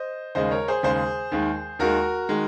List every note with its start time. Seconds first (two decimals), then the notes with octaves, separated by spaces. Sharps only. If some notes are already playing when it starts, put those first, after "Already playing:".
Already playing: C5 D#5
0.35 D#2 C#3 G#3 C5 D#5
0.51 A#4 C#5
0.68 G#4 C5
0.83 D#2 C#3 G#3 G#4 C5
1.32 D#2 D#3 G#3
1.79 D#2 D#3 G#3 F#4 A#4
2.29 D#3 G#3